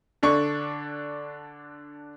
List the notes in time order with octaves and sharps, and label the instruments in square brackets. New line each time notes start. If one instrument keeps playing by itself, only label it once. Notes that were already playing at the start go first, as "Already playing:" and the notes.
[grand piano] D3 D4 C#6